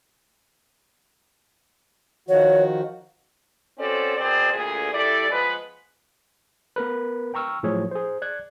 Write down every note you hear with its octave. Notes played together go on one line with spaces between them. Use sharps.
D#3 F3 F#4 C#5
C4 C#4 F#4 A4 C5 D5
B2 C4 G#4 A#4 C5 D5
D2 A#2 G#4
G3 E4 A4 D5
F3 G#3 B3 B4
B3 A#4 B4
G5 A#5 C#6 E6 F6
A2 F3 F#3 G#4 C#5
G#4 C5
D5 F#6 G#6